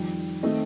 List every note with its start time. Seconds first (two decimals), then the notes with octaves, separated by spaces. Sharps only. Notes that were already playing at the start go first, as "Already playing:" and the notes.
Already playing: F2 D#3 G3 G5
0.43 D#3 A3 C4 D#5